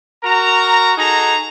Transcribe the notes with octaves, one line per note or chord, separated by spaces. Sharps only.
F#4 A#4 A#5
D#4 F#4 G#4 A4 A#5